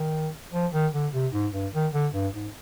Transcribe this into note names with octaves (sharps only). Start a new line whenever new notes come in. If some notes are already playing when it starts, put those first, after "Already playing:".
Already playing: D#3
F3
D#3
D3
C3
G#2
G2
D#3
D3
G2
G#2